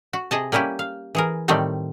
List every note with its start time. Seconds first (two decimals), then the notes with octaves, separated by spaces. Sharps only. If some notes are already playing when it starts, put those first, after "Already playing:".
0.13 F#4
0.31 C3 G#4 D#5 A5
0.52 G3 A#3 C#4 E4 G4
0.79 F5
1.15 E3 G#4 A#4
1.48 A2 D#3 G3 A3 C4 C5